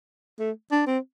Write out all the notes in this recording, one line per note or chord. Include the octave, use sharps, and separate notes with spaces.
A3
D4
C4